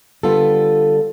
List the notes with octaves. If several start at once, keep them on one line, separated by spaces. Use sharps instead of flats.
D3 G3 B3 F4 A4